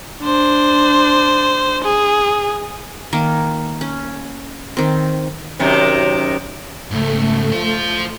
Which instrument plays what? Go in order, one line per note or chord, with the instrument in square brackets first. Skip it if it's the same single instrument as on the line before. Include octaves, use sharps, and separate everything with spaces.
[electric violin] D4 C5
G#4
[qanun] D#3 A#3
C#4
D#3 C4
[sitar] F#2 C3 D#3
[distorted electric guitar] G#2 C#3 [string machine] A3
[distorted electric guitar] F4 C5